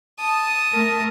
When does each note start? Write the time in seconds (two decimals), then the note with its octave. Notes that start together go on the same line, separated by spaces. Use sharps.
0.19 A5 D#6
0.73 A3 A#4